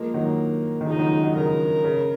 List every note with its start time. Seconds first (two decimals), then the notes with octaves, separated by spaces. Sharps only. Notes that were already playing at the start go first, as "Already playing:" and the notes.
Already playing: F3 G#3 A#3
0.14 D#3 F#3
0.81 D#3
0.86 C#3 F3 D#4
0.99 D#3 F#3
1.11 F3 G#3
1.23 D#3 F#3
1.35 C#3 F3 A#4
1.84 C#3